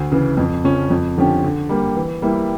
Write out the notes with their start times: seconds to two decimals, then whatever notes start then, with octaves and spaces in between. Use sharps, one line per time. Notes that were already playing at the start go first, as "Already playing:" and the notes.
Already playing: D2
0.12 C#3 E3
0.38 F2
0.64 C#3 F3 C#4
0.90 F2
1.17 D3 F3 C#4 G4
1.44 D3
1.69 G3 A#3
1.96 E3
2.22 G3 A#3 E4 G4